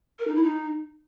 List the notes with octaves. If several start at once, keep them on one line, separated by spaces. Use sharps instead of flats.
A#4
D#4
E4
D#4